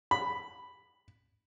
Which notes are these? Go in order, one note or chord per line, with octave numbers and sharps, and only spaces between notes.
B5